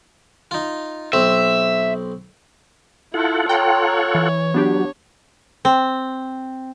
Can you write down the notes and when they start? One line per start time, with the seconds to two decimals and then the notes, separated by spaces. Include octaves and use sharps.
0.51 D#4 F4
1.13 B1 C4 E5
3.14 E4 F4 A4 F#5
3.49 C#5 G5 A#5 C6
4.15 E3
4.54 F#3 B3 D4 G4
5.65 C4